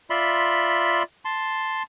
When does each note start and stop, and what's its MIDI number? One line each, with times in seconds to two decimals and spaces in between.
0.10 1.03 65
0.10 1.03 74
0.10 1.03 76
0.10 1.03 83
0.10 1.03 84
1.25 1.83 81
1.25 1.83 84